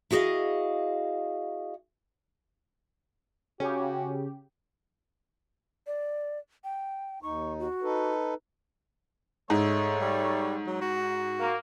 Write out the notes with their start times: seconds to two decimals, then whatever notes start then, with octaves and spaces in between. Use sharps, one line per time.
0.11 E4 F#4 G#4 C5 D#5 F5
3.60 C#3 C#4 F#4 G4
5.87 D5
6.64 G5
7.23 D#2 D#4 C#6
7.59 F#4
7.82 D#4 A4 B4
9.50 G#2 G#3 A3 A4 C#5
10.01 G3
10.67 F#3
10.81 F#4
11.40 A#3